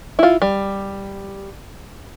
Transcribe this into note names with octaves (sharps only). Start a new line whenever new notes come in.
E4 F4
G3